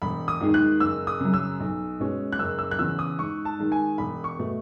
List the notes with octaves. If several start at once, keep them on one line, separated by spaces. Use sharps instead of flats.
E1 B5
D#6
D#2 D#3 G#3 D#4
F#6
F#1 E6
D#6
F#2 C#3
E6
B1
B2 G#3 C#4
F#6
F#1 E6
E6
F#6
E2 C#3 E6
D#6
G#2 C#6
A5
D#3 G#3 D#4
G#5
E1 B5
C#6
B2 A3